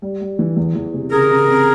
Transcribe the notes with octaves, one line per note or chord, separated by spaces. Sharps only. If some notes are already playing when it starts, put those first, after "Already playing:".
G3
G3
E3
E2
E2
C3
C#3 G#4 A#4
C#3
C4